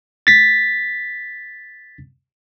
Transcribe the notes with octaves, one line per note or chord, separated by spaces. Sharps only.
A6 B6